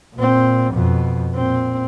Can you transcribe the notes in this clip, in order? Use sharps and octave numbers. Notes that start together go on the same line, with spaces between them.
A#2 C4
F2 B2
A#2 C4